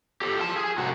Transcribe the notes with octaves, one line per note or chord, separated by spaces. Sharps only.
G4 A4
F4 A5
G#4
C2 F#4